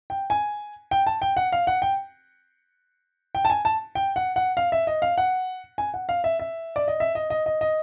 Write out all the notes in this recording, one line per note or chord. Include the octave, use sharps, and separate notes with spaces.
G5
G#5
G5
A5
G5
F#5
F5
F#5
G5
G5
A5
G#5
A5
G5
F#5
F#5
F5
E5
D#5
F5
F#5
G#5
F#5
F5
E5
E5
D5
D#5
E5
D#5
D#5
D#5
D#5